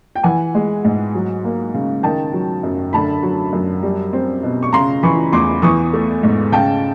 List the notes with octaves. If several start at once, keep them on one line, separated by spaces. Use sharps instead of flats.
G5
E3 F#5 G#5
G#3
G#2
F#3
A#3
C#3
D#3 G5 A5
F#3
F#2
D3 A5 B5
F#3
F#2
G3
C4
B2
C#6
C#3 A#5 C6
E3 B5 C#6
E2 C6 D6
E3 C#6 D#6
A3
G#2
C#3 G5 A5